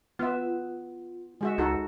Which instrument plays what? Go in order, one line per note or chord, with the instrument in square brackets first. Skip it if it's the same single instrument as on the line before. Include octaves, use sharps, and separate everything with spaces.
[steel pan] B3 E5 [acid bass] F4
[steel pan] G#3 F#4 E5
[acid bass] C#2 [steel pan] D#4 F#4 A4